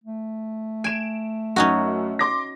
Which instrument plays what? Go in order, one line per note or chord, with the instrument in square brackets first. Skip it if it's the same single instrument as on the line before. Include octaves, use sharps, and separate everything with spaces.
[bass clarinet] A3
[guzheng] G#5 [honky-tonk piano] D7 E7
[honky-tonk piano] F#2 [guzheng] C#4 D#4 F#4
[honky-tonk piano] C6 D6 A#6